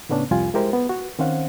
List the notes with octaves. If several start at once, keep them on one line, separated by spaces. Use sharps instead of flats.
A2 C#3 B3 C#4 D4
C2 F2 G3 F4 G#5
G#3 E4 G4 A#4 C5
B3
F#4
D#3 C4 C#4 C5 F5 F#5